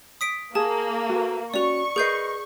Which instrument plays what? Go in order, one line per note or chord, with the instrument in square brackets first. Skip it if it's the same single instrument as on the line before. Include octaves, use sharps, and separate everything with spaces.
[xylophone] D#6 B6 D7
[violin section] A#3 [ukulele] G#4 [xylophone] A5
[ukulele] F#4 A4 B4
[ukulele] C#4 F#4 [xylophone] D5 F7 [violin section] C#6
[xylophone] G#4 G6 C7 [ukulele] A#4 B4 D#5